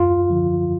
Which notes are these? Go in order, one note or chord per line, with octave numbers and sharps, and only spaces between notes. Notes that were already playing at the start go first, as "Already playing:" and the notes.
Already playing: F#2 F4
D3 F3